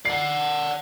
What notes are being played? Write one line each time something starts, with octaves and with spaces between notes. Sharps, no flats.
D5 F#5 C7